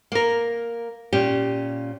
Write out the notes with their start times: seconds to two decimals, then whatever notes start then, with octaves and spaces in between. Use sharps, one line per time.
0.12 A#3 A#4
1.13 A#2 C#4 G4